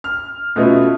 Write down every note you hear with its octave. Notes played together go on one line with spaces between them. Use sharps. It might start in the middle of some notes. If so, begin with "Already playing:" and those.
F6
B2 A3 C#4 F4 D#5